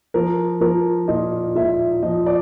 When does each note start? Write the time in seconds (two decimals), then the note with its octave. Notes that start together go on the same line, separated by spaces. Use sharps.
0.14 F3 A#4
0.61 F3 A#4
1.08 A#2 D#5
1.55 A#2 E5
2.03 F3 D#5
2.26 D5